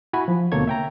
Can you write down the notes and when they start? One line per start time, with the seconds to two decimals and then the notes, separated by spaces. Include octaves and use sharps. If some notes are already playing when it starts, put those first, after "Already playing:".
0.13 E4 F#4 G#5 B5
0.28 F3
0.52 D2 B2 A#3 A4 C#5 G#6
0.67 E5 G5 A#5